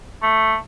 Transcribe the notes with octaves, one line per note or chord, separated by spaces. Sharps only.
A3